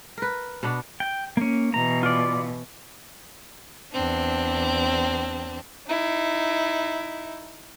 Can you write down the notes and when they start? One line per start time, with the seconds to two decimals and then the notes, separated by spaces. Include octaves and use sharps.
0.18 A#4 B4
0.63 B2 B3 D4
1.00 G5
1.37 A#3 C#4
1.74 B2 E3 A#5
2.03 F4 D5
3.93 E2 C4 D4
5.87 D#4 E4